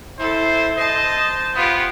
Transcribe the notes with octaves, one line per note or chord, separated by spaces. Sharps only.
E4 A4 C5
C5 D#5 A5
B3 F4 G4